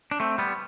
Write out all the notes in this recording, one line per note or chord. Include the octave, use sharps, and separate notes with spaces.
D4
A3 C4
G3 B3